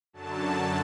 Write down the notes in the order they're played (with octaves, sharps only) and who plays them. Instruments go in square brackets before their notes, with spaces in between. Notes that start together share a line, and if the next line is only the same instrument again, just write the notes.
[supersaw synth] F#2 D3 F#3 A5